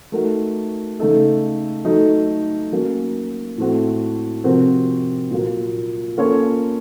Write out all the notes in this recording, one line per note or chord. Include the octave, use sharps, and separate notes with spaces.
A3 D#4 F#4 A#4
C#3 A3 D#4 A4
F#3 A3 D#4 A4
F#3 A#3 C#4
A2 A3 C4 F#4
C3 F3 C4 F#4 A#4
A#2 F#3 A#3
A#3 C#4 F4 A4 C#5